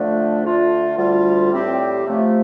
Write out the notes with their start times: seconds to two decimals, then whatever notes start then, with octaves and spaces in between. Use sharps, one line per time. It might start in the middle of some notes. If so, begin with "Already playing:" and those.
Already playing: D3 F3 A3 D4
0.44 D3 A3 F4
0.97 D2 D3 G3 F4
1.52 A2 G3 C4 G4
2.06 C3 F3 A3